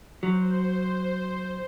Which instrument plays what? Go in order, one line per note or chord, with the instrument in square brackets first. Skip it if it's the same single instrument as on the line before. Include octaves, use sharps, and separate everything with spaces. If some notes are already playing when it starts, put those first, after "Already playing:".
[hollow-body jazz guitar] F#3 [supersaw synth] C5